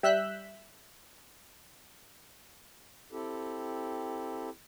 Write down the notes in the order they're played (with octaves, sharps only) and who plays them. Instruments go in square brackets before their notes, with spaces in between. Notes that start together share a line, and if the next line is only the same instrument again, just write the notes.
[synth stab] G3 E5 E6 F#6 G6 B6
[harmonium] C4 E4 G4 A4